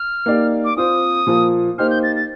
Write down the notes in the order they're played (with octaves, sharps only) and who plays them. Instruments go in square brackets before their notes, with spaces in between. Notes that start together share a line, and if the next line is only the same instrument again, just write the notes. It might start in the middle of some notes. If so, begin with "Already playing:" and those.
Already playing: [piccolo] F6
[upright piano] A#3 D#4 G4 D5 F5
[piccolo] D6
[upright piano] C4 F4 C5 [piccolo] D#6
[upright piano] A#2 F3 A#3
[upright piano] A#3 D#4 G4 C5 [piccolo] F6
[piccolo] G6
A6
A6